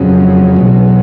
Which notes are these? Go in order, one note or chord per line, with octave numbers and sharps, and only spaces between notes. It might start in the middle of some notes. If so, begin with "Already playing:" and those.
Already playing: F2 C#3 F#3
E2 B2 F#3